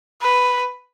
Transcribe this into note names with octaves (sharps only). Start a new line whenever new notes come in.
B4